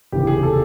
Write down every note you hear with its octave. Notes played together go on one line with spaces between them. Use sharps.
F1 D#2 C#3 E3 G4
G#4
A4